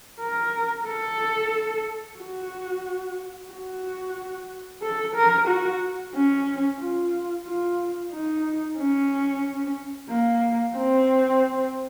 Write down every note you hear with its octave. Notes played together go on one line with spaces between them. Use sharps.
A#4
A4
F#4
F#4
A4
A#4
F#4
C#4
F4
F4
D#4
C#4
A#3
C4